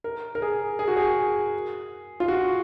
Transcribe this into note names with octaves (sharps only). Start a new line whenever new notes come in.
A#4
A#4
G#4
G#4
F#4
G#4
F4
F#4